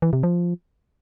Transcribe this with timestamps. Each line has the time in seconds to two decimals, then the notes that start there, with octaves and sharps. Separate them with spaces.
0.02 E3
0.13 C3
0.23 F3